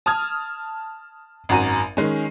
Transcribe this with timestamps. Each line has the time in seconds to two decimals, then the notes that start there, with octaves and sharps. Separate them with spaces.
0.06 A5 D#6 F6 G#6
1.49 G#1 F#2 F#4 A#5 D#7
1.97 D#3 G#3 C#4